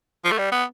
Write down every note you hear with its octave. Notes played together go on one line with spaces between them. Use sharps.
F3
A3
G3
B3